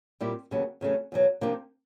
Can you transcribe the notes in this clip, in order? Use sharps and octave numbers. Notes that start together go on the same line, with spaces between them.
A#2 G3 C4 E4 G4
D#2 C#3 F#3 B3
E2 C#3 F#3 A3 C#4
E2 B2 F#3
C3 F3 A#3 D4 G4